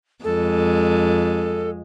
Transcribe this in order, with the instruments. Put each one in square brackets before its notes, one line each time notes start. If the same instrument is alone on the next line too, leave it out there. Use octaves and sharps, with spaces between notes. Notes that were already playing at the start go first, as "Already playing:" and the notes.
[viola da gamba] F2 G#3 [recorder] A4